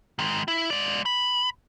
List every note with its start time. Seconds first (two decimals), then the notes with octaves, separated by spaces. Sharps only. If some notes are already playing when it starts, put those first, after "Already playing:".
0.19 D#3 G#3
0.48 E4
0.70 G#3 D5
1.06 B5